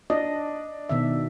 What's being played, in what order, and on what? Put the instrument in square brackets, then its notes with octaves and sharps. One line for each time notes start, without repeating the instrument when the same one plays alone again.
[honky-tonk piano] D4 [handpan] D#5
[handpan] B2 D#3 E5